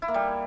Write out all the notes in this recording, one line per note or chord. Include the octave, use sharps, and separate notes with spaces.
E4
A#3
G3